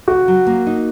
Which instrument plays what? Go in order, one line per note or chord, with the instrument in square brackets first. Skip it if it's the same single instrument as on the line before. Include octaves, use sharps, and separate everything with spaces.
[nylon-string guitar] C#3 [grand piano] F#4
[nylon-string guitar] F#3
A#3
D#4